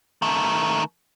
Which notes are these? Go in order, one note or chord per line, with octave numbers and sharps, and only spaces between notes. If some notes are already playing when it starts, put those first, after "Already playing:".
D#3 A3